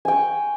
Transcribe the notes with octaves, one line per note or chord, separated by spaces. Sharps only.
G5 G#5 C#6